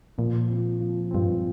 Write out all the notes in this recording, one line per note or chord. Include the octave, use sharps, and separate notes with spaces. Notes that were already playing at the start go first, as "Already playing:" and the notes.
A#2 F3
C4 F4
F3
G2 C4 F4